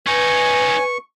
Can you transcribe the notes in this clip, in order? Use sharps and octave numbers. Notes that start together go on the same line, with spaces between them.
C#4 D#4 B4 G#5 C#6